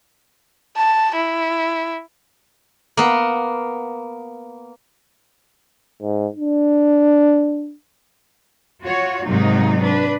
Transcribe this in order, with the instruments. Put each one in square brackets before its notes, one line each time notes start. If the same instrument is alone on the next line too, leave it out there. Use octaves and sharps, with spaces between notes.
[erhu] A5
E4
[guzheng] A#3 B3
[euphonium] G#2
D4
[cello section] F4 F#4 C#5
G#2 C3 F#3 A#3 D#4
D4 B4